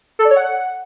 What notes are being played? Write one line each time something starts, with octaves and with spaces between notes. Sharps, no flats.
A4
D5
C#5
F#5